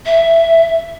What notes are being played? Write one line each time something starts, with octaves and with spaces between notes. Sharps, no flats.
E5